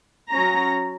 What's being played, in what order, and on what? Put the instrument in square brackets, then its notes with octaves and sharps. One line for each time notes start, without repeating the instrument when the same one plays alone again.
[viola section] F#3 C#4 A#5